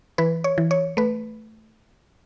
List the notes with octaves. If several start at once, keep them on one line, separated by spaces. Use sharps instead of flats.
E3 B4
C#5
E3
C#5
A3 B4